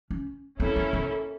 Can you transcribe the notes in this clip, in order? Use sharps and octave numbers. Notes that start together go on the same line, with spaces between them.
C#4
A#3 C4 C#4 E4 A4
B3
B3